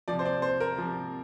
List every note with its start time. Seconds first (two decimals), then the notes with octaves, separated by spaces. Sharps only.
0.08 C3 F3 D5
0.19 C5
0.25 D5
0.42 C5
0.60 A#4
0.78 C3 F3